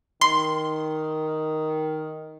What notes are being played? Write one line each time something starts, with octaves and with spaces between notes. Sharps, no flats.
D#3 C6